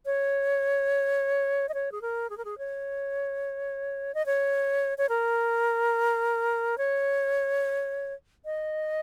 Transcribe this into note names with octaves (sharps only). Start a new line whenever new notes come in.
C#5
D#5
C#5
G#4
A#4
G#4
A#4
G#4
C#5
D#5
C#5
C#5
A#4
C#5
D#5